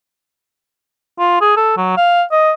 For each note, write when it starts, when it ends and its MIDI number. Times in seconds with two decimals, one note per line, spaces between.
1.19 1.40 65
1.41 1.54 68
1.57 1.73 69
1.77 1.93 54
1.97 2.23 77
2.32 2.53 75